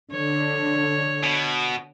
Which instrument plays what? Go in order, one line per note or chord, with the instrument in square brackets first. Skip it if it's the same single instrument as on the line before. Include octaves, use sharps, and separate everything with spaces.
[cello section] D3 [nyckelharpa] C#5
[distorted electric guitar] B2